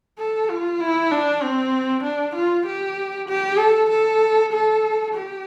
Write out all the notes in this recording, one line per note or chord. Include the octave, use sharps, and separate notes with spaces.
A4
F4
E4
D4
C4
D4
F4
G4
G4
A4
A4
A4
G4